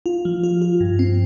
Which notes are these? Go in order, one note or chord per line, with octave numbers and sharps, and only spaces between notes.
F4
F3
F4
F4
G2
C4